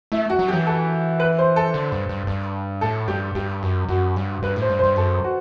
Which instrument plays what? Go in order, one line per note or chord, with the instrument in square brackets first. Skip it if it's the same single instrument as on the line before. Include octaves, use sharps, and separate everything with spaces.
[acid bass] A3 [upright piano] E4
[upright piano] F#4
[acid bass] F#3
[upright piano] G4
[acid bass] E3
[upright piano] A4
B4
C5
A4
[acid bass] D3
G2
G2
G2
[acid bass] A2 [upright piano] A4
[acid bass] G2 [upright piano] G4
[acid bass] G2 [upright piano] G4
[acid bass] F#2
[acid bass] F#2 [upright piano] F#4
[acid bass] G2
[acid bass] G2 [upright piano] B4
[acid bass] A2
[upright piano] C5
[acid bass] G2
[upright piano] C5
[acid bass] G2
[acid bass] F#2 [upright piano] A4
[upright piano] F#4